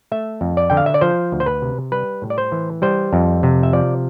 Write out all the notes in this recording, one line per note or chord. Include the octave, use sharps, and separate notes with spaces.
A3 E5
F2
D5
D3 G5
F5
E5
D5
F3 C5
D2
C5
B4
C3
G3 B4
A2
D5
C5
E3
G3 C5
F2
C3
E5
F3 D5